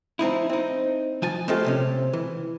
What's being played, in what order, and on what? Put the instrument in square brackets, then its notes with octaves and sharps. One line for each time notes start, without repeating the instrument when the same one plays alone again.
[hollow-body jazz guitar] F3 C4 D#4 E4
C4 D#4
F3 G#5 A5
G#3 A3 C4 F4 G4 A4
C3 C4 C#4
E3